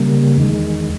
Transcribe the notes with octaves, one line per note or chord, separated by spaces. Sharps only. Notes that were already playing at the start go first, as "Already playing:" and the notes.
Already playing: C#3 G3 A#3
E2 D#3 G#3